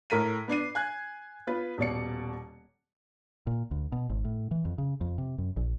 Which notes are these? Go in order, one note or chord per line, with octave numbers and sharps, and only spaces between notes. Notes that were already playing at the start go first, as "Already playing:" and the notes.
A2 A#4 B6 D#7
B3 D4 C7 D#7
G#5 F#6 G#6
B3 F4 B4
D#1 B2 D5 C#7
A#2
D2
B2
G#1
A2
E3
F2
C#3
F2
C3
F#2
A#1